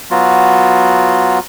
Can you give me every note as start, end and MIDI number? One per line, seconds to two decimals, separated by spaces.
0.11 1.39 54
0.11 1.39 59
0.11 1.39 65
0.11 1.39 66